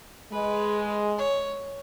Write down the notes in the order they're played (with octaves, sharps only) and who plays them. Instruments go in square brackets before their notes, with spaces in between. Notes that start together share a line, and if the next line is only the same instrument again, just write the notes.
[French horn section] G#3 [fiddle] B4
[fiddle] C#5